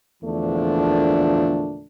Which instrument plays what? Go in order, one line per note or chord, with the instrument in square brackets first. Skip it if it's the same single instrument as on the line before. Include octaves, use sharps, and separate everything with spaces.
[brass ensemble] E2 A#2 D3 F3 A3 D4